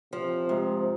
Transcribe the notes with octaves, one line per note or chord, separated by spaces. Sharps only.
C3 F3
G#2 C3